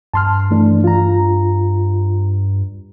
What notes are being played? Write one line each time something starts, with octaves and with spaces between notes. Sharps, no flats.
G2 A5 C6 F6
E3 A3 D4
F4 A#5